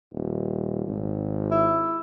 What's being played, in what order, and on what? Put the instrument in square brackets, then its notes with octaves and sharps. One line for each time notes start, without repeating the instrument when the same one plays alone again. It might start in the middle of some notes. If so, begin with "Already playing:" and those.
[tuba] D#1
G#1
[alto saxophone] E4